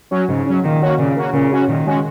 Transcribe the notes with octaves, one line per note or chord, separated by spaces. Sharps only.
F#3 C#4
G#2 C#3
F#3 C#4
A#2 D#3
A#3 C#4 F#4
A#2 C#3
A#3 C#4 F#4
A#2 C#3
G#3 C#4 F#4
A#2 D#3
G#3 C#4 F#4